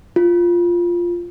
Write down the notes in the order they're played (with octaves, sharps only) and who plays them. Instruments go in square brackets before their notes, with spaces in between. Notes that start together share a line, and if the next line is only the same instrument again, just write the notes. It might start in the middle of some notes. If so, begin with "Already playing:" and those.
[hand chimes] F4